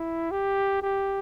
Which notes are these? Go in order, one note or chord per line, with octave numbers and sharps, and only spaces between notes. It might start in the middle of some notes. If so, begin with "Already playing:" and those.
Already playing: E4
G4
G4